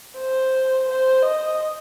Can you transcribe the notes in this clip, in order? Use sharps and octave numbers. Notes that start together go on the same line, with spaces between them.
C5
C5
D#5